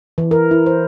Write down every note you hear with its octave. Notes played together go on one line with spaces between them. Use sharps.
E3
A#4
E4
C5